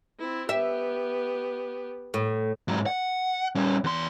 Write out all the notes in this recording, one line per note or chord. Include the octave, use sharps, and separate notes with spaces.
C4 E4
B3 G4 E5
A2
G#2 F#3
F#5
G3 C#4
E2 C6